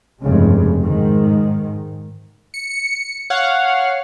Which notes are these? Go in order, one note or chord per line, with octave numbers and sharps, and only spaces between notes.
F1 G2 C#3 G#3
G#2 D#3
C#7
C#7
C#5 F5 F#5